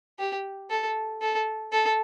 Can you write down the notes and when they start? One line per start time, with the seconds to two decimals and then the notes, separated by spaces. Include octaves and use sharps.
0.19 G4
0.70 A4
1.22 A4
1.73 A4